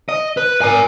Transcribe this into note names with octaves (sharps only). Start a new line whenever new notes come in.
D#5
B4
A#4 G#5